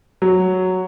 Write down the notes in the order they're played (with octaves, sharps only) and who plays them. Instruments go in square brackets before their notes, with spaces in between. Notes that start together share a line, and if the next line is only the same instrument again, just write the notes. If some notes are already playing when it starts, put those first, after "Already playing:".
[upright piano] F#3